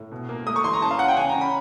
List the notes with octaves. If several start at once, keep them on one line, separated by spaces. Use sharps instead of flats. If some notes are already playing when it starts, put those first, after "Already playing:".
Already playing: A2
B2
A#3
A3 D#6
C#6
E3 C6
A#5
C#4 A5
F5
C#4 F#5
G5
C#3 G#5
A#5
C#4
B5